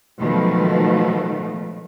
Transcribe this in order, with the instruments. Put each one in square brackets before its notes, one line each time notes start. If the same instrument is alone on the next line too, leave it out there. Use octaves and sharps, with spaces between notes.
[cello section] B2 D#3 F3 F#3 G#3 A3